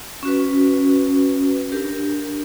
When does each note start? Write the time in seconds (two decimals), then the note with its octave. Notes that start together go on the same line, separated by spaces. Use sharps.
0.23 C#4 F#4 B4
1.72 D4 G4 A#4